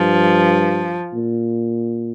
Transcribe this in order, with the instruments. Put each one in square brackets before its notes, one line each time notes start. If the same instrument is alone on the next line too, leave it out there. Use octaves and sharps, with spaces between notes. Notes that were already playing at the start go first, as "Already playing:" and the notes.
Already playing: [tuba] G2 [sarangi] F3
[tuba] A#2